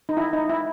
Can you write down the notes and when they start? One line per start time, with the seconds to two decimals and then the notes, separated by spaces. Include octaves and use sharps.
0.09 D#4
0.17 E4
0.33 D#4
0.49 E4